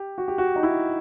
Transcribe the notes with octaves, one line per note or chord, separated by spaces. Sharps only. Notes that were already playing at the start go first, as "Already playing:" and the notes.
Already playing: G4
F#4
G4
F#4
D#4
E4